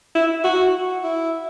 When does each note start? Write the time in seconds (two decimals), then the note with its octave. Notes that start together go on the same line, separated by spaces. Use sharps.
0.15 E4
0.44 F#4
1.04 E4